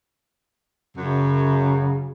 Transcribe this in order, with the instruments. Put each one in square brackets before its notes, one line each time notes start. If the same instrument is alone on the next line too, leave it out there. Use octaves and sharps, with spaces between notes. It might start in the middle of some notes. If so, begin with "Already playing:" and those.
[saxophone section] F#2 [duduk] C#3